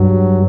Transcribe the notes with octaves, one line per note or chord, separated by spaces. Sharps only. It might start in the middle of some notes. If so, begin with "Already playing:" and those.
Already playing: G2 F#3